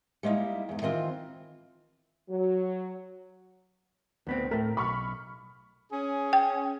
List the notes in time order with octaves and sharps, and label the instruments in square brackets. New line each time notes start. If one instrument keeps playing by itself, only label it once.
[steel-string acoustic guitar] G3 G#3 A#3 D#4 E4
E2 G#2
D#3 E3 C4 F4
[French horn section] F#3
[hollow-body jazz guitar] D2 B3 C4
[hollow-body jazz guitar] A2 A3 [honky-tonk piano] A#4
[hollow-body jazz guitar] B1 [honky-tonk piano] B5 C#6 F6
[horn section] C#4 G#4
[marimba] G5